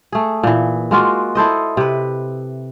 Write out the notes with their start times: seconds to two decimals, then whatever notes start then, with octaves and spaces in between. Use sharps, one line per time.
0.12 A3 G#4
0.43 A#2 E3
0.91 G#3 A#3 F4 F#4
1.35 E4 A4 C5 D#5
1.77 C3 B4